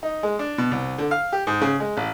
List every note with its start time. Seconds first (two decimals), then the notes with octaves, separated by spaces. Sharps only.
0.03 D#4
0.23 G#3
0.39 D4
0.58 B2
0.71 C2
0.98 D3
1.11 F5
1.32 G4
1.47 G#2
1.61 C#3
1.80 G#3
1.97 A1